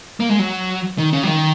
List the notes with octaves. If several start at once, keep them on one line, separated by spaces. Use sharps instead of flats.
A#3
G#3
F#3
D#3
C#3
F#3
D#3